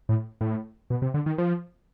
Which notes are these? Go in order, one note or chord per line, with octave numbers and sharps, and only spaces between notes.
A2
A2
B2
C3
D3
D#3
F3